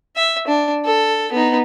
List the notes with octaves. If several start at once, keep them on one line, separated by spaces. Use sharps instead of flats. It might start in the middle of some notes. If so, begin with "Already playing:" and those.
E5
D4
A4
B3 D#4